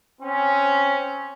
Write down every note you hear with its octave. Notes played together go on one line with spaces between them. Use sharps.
C4 C#4